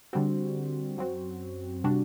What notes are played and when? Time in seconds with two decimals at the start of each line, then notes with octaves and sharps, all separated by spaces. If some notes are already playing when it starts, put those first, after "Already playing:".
0.13 D3 G3 C4 F#4
0.98 F#2 F#3 C4 F#4
1.84 C3 G3 D4 F#4